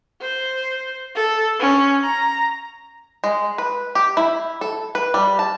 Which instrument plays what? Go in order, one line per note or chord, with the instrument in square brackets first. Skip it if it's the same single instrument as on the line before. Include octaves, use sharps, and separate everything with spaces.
[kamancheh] C5
A4
C#4
A#5
[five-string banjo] G#3
B4
G4
E4
A4
B4
G3
A5